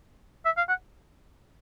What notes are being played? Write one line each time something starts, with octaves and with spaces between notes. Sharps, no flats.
E5
F5
F#5